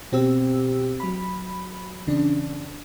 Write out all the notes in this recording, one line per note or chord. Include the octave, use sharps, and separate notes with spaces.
B2 C4 G4 E6
F#3 B5
E2 C#3 D4